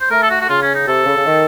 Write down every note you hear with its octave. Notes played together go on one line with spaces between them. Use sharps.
C5
A3 A#4
A4
F#4
F#4
C#3 F4
C#4
D#4
C3 A4
C#3
C#3
D#3